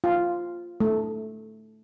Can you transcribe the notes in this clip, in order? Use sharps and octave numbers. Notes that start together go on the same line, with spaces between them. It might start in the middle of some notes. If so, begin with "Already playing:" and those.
F4
A3